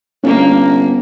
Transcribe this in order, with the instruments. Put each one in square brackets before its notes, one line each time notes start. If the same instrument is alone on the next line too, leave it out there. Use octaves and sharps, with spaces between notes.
[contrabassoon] G1 [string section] A#3 [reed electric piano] C#4